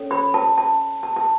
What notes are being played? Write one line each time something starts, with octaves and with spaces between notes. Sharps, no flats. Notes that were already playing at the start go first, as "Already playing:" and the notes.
Already playing: C#4 A4 C#5
B5
A5
A5
A5
A5